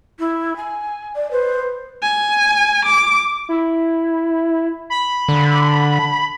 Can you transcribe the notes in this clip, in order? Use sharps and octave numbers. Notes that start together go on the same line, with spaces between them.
E4
G#5
D5
B4 C5
G#5
D6
E4
B5
D3